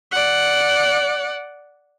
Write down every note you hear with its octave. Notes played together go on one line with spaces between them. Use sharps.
D5 F#5